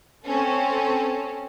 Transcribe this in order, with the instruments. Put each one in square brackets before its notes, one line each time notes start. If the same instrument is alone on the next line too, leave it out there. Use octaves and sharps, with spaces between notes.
[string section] C4 C#4 A4